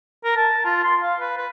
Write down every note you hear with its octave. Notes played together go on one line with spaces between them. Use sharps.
A#4
A5
F4
C6
F5
B4
B4